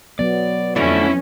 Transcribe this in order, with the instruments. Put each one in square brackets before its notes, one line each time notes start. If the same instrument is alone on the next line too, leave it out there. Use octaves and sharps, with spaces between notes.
[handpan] F#3 B3 [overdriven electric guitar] D5
[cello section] F2 C#4 [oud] D3 A3 F#4 [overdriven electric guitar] E4